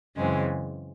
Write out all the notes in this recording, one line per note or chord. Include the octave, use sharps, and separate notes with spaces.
F#2 C#3 E3 G#3 C4